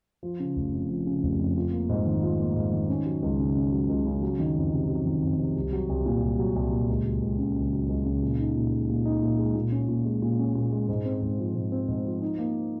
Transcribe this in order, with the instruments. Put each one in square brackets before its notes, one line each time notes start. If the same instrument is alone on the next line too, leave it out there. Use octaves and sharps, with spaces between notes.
[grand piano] F3
C#3
F1
F2
F3
C#3
F1
F2
F4
A#3
G#2
D#3
F4
A#3
G#2
D#3
C#4
F#3
C#2
C#3
C#4
F#3
C#2
C#3
F#3
D#3
F2
C3
F#3
D#3
F2
C3
C2
F#3
C2
A#2
C2
F#3
C2
A#2
C#2
F#3
C#2
C#3
C#2
F#3
C#2
C#3
A#2
D#4
A#2
G#3
A#2
D#4
A#2
G#3
A#2
C#4
A#2
G#3
A#2
C#4
A#2
G#3
G#2
C4
G#2
F3
G#2
C4
G#2
F3
D#4
A#3